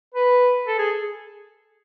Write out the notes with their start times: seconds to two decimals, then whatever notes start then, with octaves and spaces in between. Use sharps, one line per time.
0.14 B4
0.67 A4
0.78 G#4